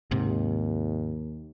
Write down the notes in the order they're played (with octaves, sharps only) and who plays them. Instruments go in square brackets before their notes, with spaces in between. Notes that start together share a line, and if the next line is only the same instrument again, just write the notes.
[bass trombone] D#2 [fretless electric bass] G#2 C3